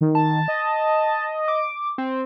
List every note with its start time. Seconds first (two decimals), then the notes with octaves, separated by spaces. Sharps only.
0.01 D#3
0.15 A5
0.48 D#5
1.48 D6
1.98 C4